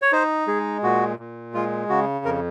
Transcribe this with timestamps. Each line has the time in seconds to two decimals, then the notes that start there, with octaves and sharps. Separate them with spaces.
0.02 C#5
0.12 D#4 C5
0.47 G#3 G#4
0.83 A#2 F#4
1.19 A#2
1.54 G#3 F4
1.89 C#3 F#4
2.25 F2 A#4